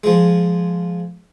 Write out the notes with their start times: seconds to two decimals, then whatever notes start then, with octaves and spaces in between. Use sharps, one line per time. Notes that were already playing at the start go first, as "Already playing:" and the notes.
0.04 F3 G#3